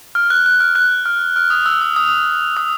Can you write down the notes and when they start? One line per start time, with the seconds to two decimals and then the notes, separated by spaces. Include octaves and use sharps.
0.15 F6
0.30 F#6
0.46 F#6
0.60 F6
0.75 F#6
1.06 F6
1.36 F6
1.50 D#6
1.66 E6
1.82 D#6
1.96 D#6
2.57 D#6